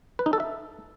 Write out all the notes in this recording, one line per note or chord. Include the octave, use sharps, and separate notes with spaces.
B4
D#4
A4
E5